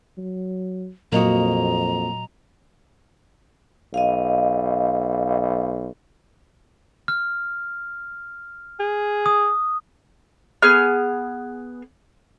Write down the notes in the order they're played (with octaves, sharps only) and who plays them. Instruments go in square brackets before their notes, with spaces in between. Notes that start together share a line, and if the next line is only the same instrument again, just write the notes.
[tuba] F#3
[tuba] F2 [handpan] A#2 F#3 D#5 [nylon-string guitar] A#3 F#4 [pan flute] A#5
[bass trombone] B1 [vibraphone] D#5 F5
[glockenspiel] F6
[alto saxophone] G#4
[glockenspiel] D#6
[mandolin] B3 G#4 F6